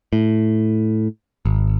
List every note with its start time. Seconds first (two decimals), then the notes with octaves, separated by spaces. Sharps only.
0.13 A2
1.45 G#1